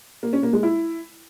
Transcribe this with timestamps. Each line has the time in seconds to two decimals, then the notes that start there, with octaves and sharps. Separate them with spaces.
0.23 A#3
0.33 C#4
0.43 A#3
0.53 G#3
0.63 E4